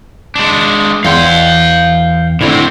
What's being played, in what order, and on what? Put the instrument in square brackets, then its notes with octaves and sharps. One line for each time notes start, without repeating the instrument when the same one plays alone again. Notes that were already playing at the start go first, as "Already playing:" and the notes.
[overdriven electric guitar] G#3 D4
[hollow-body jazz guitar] E2 C6 [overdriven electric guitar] F5 G5
[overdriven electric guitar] A2 C4 [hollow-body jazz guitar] D3 E4